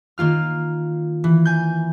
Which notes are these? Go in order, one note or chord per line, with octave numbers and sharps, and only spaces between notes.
D#3 A#3 F4 F6
E3
G#5 G6